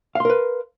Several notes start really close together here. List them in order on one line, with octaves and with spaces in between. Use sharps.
F5 C6 A#4 B4